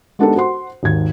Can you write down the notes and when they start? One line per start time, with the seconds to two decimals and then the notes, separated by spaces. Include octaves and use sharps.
0.19 G#3 B3 D4 D#4 G4 A4
0.35 F#4 C5 F#5 C6
0.83 G#1 D#2 G#6